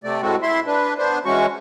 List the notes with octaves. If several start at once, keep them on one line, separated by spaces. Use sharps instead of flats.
C3 A3 D5
A2 G#3 A3 C4 F#4
E4 E5 C6
D4 B4
B3 D4 C5
E3 G#3 C#4 F#4 C#6